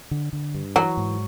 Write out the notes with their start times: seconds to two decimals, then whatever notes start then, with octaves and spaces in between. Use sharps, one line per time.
0.11 D3
0.33 D3
0.55 G2
0.76 E3 F#3
0.97 G#2